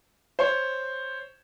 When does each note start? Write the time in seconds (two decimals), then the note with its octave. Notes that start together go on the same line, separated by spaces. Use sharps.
0.39 C5 C#5